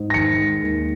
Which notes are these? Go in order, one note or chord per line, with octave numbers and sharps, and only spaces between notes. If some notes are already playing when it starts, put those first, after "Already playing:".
Already playing: G#2
A#6
D#3 C#7
G#3
D#2